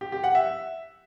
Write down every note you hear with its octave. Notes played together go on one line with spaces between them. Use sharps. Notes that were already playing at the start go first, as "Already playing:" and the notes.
G4
G4
F#5
E5